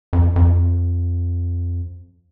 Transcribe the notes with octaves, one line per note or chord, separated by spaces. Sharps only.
F2
F2